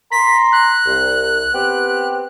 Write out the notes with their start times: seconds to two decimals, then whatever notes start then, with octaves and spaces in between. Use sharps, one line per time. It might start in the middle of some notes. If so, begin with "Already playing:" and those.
0.12 A#5 C6 B6
0.52 F#6
0.86 C2
1.53 B3 C4 G4